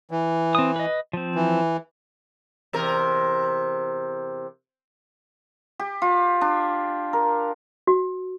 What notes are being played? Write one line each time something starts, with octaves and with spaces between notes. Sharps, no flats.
E3
C4 D#6
B4 D#5
F3 C4
E3
E2 C3 A#4
G4
F4
D4
A#4
F#4